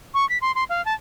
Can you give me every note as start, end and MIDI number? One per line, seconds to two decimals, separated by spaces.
0.14 0.27 85
0.29 0.38 95
0.42 0.54 84
0.55 0.64 84
0.69 0.84 77
0.85 0.94 81